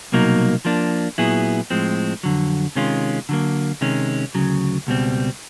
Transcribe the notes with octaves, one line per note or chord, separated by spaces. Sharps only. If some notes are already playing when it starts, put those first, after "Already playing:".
C2 B2 F#3 A#3 D#4
F3 A#3 D4
A#2 F#3 B3 E4 G#4
A2 F3 G#3 C4
F2 D3 F#3
C3 D#3 G#3 C#4 F4
D3 F#3 A#3
C3 D#3 G#3 C#4
D2 C#3 F#3
C#2 B2 G3 C4